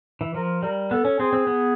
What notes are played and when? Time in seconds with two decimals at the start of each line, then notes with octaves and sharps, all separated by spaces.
0.21 E3
0.34 F3 A#4
0.62 G3 A#4
0.91 B3 A4
1.05 C#4
1.20 C4 G#4
1.33 C4
1.47 B3